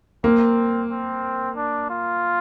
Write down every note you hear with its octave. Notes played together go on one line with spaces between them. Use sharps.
A#3 C4
C4
D4
F4